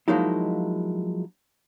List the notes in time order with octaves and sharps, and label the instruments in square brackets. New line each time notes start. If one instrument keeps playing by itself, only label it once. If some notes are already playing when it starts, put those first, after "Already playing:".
[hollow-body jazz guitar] F3 F#3 G#3 A#3 D#4 E4